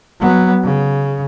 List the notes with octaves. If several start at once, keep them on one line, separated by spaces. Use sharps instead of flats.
F#3 B3
C#3